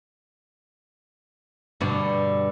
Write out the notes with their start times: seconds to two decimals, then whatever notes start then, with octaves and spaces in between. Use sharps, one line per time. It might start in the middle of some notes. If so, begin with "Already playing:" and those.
1.81 G2 B2 D3